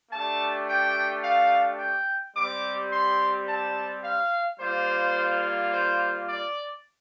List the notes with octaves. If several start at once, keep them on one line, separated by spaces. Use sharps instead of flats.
A3 D4 G4 A5
G5
F5
G5
G3 C4 G4 D6
C6
A5
F5
G3 A#3 F4 C5
C5
D5